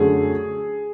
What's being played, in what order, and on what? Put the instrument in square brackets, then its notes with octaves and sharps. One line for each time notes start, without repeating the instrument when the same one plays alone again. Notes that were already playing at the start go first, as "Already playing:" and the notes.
Already playing: [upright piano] F#2 D3 A3 G#4